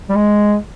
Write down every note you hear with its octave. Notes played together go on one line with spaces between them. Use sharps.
G3
G#3